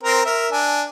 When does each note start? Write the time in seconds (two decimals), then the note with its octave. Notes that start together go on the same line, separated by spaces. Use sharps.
0.04 C4 A#4 A#5
0.25 A#4 E5
0.52 D4 G#5